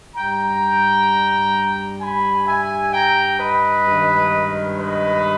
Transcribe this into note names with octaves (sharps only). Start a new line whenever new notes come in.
G2 G3 G5 A#5
G#5 B5
E5 G#5
G5 A#5
B4 D#5
G2 D#3 G#3
B4 D#5